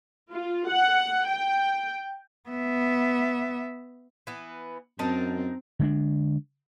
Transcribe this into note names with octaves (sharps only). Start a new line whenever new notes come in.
F4
F#5
G5
B3 E5
E3 B3
F#2 C4 D#4 A#4 A5
D3 G#3 D4